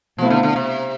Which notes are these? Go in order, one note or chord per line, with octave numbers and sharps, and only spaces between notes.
B2 F3 A3 C4 E4
D3
D3
C3